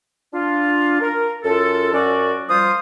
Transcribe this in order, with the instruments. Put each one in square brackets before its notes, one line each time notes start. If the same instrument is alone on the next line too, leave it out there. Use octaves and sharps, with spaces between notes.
[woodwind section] D4 F4
A#4
F#2 F4 A4
F#2 C#4 F#4 D5
F3 G3 F4 C5 D#6